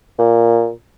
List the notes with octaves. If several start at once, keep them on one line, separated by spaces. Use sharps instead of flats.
A#2